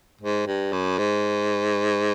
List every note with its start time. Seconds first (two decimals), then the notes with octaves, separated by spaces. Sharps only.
0.21 G#2
0.47 G2
0.72 F#2
0.98 G#2